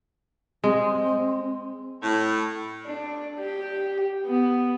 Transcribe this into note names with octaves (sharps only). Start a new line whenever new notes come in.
G#3 C4
A2
D4
G4
B3